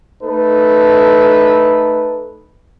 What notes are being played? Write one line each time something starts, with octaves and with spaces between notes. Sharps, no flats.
A3 D#4 A4 B4